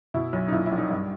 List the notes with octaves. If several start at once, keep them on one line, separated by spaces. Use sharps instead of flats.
B2 E4
B1
D#4
A#2 E4
E4
A#1
D#4
G2